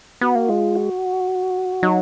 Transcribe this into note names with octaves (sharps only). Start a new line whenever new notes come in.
B3 F#4
A#3
G#3 F4
F#4
F#3 D#4